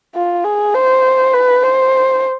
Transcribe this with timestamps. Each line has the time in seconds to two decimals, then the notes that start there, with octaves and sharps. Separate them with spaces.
0.15 F4
0.44 G#4
0.74 C5
1.34 B4
1.63 C5